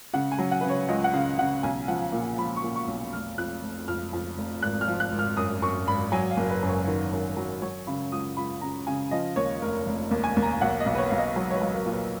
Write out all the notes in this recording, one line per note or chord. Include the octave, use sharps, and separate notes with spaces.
C#3 F#5
G#5
F#3
F#5
C#3 B4
C#5
C#2 D#5
F#5
C#3 F5
C#3 F#5
B1 G#5
F3 F#5
A#2
F3 B5
C#6
A#2
C#6
B1
F1 F6
F2 F#6
F1
F2 F6
F2
F1
G#1 F#6
F6
F3
F#6
G#1
F6
F#2 D#6
F#2 C#6
G#1 B5
F#3 G#5
F5
F#1
B4
F#2
C#5
D#3
F#2
F#3
F#3 C#5
C#3 B5
C#2 D#6
C#2 B5
C#3 A#5
C#3 G#5
F3 D#5
D#2 C#5
F1 A#4
F1
D#2
G#5
D#2
A#5
B1 F#5
D#5
B1
B4
C#5
B1 F5
D#5
F#3 C#5
C#5
B4
F#3
A#4
A#2
B4